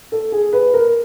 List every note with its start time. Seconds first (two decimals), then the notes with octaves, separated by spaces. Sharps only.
0.12 A4
0.32 G#4
0.53 B4
0.74 A#4